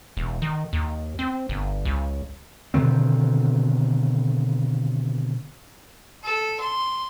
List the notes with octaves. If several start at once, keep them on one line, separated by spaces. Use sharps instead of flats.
E1
D#3
D#2
C4
G1
C#2
B2 D3 D#3 C4
A4
C6